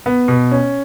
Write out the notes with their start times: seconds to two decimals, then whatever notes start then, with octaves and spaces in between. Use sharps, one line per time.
0.06 B3
0.28 B2
0.51 C#4